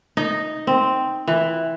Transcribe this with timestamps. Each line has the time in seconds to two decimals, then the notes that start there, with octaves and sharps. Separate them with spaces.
0.17 D#4
0.67 C4
1.28 E3